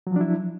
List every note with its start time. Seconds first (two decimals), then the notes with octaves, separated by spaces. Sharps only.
0.07 F#3
0.11 F3
0.16 D4
0.21 E4